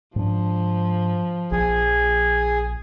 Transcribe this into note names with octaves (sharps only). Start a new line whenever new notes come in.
G#2 F3 C4 D4
A#1 G#4